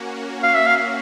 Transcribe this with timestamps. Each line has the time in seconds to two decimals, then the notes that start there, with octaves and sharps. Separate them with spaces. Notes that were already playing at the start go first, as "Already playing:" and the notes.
Already playing: A#3 C#4 F#4
0.43 F5
0.55 E5
0.67 F5